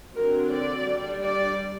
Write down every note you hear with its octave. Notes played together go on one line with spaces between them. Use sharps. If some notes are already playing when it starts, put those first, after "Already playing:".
D3 F#3 C4 A#4
D5
G3 D4
D5